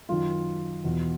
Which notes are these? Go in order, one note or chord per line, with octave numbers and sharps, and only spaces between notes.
F#2 D#3 F4
E2 B2